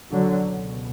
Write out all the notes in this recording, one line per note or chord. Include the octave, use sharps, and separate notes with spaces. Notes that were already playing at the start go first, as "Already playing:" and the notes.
C#2 B2 D3 F#3